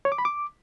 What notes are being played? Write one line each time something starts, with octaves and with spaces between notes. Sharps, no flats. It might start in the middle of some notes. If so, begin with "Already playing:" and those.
C#5
D6
B5
D6